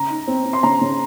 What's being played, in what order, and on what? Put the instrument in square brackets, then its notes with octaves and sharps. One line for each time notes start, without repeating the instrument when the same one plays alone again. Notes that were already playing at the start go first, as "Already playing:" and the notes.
Already playing: [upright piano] C#3 A#5
D#4
C4
C4
C6
C#3 A#5
C#3